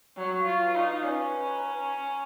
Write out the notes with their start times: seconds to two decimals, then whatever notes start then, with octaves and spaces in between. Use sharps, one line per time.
0.17 F#3 C#6
0.38 F5
0.47 F4
0.60 B4
0.75 D#4
0.82 B4
1.04 C#4 B4
1.26 B4
1.48 A#5